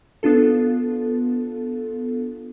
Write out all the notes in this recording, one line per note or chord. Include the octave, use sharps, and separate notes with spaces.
B3 D4 F4 A4